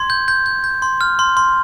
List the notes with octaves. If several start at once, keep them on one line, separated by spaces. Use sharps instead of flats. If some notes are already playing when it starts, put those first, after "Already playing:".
Already playing: C6 G#6
G6
G6
G6
G6
C6
F6
C6
C6